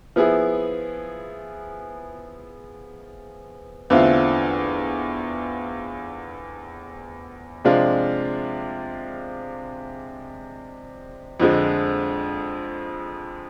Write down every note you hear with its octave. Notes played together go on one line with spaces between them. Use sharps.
F3 B3 E4 G#4
E2 D3 A3 C4 F4
C3 F3 G#3 D4 F4
F2 D3 F3 G#3